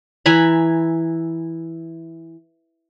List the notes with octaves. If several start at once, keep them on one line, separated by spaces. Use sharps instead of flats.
E3 G#5 A#5 B5